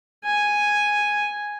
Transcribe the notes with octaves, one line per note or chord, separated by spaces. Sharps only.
G#5